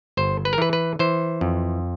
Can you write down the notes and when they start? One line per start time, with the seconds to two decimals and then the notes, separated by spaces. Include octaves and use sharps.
0.17 G1 C5
0.45 B4
0.53 A#4
0.58 E3 B4
0.73 B4
0.99 E3 C5
1.41 F2